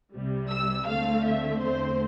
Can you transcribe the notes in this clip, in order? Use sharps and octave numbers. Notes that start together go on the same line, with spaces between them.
C2 C3 G3
E6
D2 D3 A3 C4 F5
E5
E2 D3 A3 C4 C5